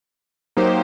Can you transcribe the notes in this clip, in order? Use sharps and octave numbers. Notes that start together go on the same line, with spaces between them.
F#3 A#3 D#4 G4 C5